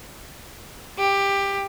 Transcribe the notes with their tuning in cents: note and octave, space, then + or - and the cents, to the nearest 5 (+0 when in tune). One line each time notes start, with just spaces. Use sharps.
G4 +15